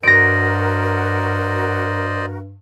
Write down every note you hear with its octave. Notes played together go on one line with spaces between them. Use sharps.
G2 F#4 A#4 C5 D5 D#5 A#6 D7